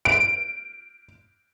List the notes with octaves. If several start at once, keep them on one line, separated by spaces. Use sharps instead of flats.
D7